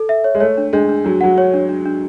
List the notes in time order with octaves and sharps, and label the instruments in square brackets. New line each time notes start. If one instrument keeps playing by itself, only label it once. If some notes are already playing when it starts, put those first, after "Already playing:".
Already playing: [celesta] A4
E5
C#5
[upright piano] G#3
[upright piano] A3 [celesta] C#5
[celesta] D4
[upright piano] G#3 [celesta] D4
[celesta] D4
[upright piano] F#3 [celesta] D4
[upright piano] F#3 [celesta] F#5
[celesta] C#5
D4
D4
D4